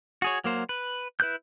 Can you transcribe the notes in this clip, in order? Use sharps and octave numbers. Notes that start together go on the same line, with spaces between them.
F#4 G#4 C#5
F#3 A#3 C5
B4
E4 B4 F#6 G6